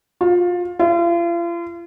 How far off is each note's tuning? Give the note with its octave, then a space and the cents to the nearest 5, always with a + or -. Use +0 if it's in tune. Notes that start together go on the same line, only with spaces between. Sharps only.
F4 +20
F4 -40